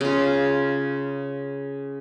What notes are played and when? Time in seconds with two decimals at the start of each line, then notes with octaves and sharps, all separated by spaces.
0.01 C#3 F4